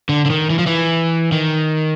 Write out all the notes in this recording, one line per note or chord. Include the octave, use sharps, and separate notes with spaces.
D3
D3
D#3
E3
F3
E3
D#3